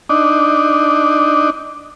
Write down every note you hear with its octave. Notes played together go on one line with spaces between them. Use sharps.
D4 D#4